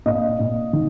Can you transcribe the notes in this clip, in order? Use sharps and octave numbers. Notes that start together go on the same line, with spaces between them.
A#2 D#5
A#2
D#3